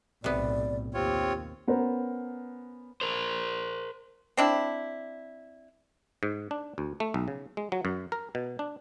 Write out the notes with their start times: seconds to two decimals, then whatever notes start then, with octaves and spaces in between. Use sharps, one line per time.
0.24 B1 A2 C3 B3 D5
0.94 D#2 C4 F4 G4 C#5
1.68 B3 C#4 A#4 C5
3.01 A#4 C5
4.37 C4 D4 E4
6.23 G#2
6.51 D4
6.78 D2
7.00 A3
7.14 B1
7.28 C#3
7.57 G#3
7.72 F#3
7.85 F#2
8.12 A#4
8.35 B2
8.59 D4